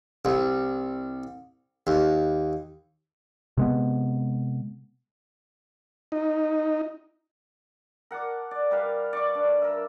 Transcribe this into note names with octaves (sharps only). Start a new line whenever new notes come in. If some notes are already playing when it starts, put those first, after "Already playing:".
C2
D#2
C3 G#3 B3
D#4
A#4 F#5 A5 D6
D5
G3 A#4 B4 F5
D5 C#6 D6
D4
A#4 E5